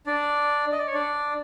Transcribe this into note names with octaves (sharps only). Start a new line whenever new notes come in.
D4 D5
D#5
D5
C#5
D4 D5